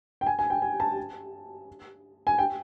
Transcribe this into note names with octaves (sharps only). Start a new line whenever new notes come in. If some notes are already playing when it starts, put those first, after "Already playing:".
G5
G#5
G#5
G5
G#5
A5
G#5
G5